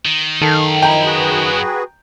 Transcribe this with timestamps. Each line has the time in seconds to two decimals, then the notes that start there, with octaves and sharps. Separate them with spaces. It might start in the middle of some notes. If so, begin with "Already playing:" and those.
0.05 D#3
0.41 F#2 D#3 A4 F5
0.82 F3 E4 G5 A#5
1.05 F#4 G#4 B4